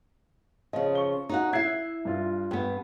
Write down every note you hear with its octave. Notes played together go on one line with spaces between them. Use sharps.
C#3 F3 D#5
C#6 G7
D#4 F#4 F#5
E4 E5 F#6 G#6 C7
G2 F4
G2 B3 G5